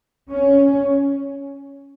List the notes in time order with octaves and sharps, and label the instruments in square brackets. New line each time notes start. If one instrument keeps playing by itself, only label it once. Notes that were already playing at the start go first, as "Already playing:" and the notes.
[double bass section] C#4